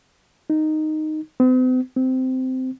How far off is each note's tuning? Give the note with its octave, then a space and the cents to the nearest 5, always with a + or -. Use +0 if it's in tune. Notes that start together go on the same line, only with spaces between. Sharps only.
D#4 -5
C4 -45
C4 -15